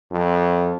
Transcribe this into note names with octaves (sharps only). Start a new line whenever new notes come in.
F2